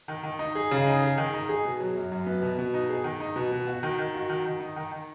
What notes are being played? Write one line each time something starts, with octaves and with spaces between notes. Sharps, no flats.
D#3
D#3
D#4
G#4
C#3
D#4
G#4
D#3
D#4
G#4
B2
F#3
F#2
F#2
B3
B2
B2
D#4
G#4
D#3
D#4
B2
B2
F#4
D#3
D#3
F#4
D#3
D#3
D#4
D#3
D#3